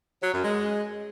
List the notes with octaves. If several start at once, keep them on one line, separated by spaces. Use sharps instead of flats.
F#3
F#2
G#3